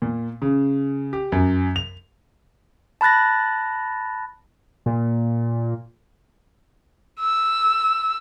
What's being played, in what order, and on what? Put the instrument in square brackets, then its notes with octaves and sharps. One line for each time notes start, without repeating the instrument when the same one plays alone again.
[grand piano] A#2
C#3
G4
F#2
F7
[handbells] A5 B5 F#6 A6 A#6
[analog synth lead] A#2
[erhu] E6